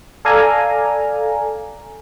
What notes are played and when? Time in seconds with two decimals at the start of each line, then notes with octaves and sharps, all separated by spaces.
0.25 A4 D5 F5 G#5 A#5